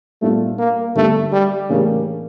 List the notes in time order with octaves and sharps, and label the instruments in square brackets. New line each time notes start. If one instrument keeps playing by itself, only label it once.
[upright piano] A#2 G3 D4 F4 [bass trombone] A3
[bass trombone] A#3
[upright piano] D3 G3 D4 G4 [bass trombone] A3
[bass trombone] G3
[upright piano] A2 E3 A#3 D4 G4 [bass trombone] C#3